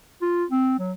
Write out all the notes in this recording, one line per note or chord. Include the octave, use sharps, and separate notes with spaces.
F4
C4
F#3